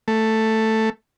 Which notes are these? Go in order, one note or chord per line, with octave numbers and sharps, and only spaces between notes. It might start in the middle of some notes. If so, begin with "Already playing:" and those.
A3